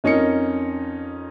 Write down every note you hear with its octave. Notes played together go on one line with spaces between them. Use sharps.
F2 C#4 D#4 A#4 C#7